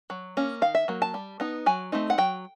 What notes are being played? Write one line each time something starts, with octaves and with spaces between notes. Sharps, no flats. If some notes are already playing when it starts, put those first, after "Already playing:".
F#3
A#3 C#4
D#3 F5
E5
F#3 A#3
A5
G3
B3 D#4
F#3 G#5
A3 C4 D#4
F#5
F#3 G5